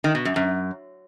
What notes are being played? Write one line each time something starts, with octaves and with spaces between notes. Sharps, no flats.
D#3
B2
F#2
F#2